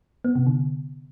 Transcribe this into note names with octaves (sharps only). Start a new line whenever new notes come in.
B3
C3
D3